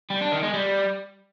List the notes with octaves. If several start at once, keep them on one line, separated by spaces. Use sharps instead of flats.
G3
D4
D#3
G#3
G3